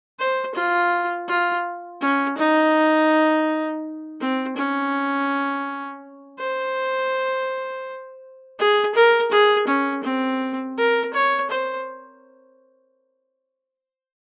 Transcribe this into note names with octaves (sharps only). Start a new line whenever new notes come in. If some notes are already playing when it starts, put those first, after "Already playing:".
C5
F4
F4
C#4
D#4
C4
C#4
C5
G#4
A#4
G#4
C#4
C4
A#4
C#5
C5